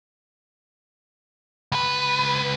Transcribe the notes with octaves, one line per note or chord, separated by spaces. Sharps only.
C#2 B4